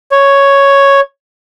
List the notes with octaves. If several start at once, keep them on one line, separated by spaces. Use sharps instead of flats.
C#5